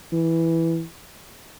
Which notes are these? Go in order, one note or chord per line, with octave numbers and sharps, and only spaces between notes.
E3